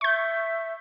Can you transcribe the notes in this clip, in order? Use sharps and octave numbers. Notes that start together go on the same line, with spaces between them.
E5 C#6 G6